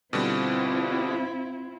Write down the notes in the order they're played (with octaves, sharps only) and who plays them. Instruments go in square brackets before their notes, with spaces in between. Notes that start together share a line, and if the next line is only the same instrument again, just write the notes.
[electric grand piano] B2 D3 G3 [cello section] C4 E4 F4